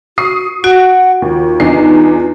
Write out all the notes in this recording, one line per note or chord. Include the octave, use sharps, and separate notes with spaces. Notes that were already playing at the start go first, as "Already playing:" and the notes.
F#4 C#6 D#6 C7
F#4 F#5 D7
D#2 F4
E2 D4 D#4 C7